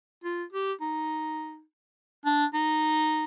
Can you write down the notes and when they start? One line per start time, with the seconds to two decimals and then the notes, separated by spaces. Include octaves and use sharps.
0.24 F4
0.53 G4
0.81 D#4
2.25 D4
2.54 D#4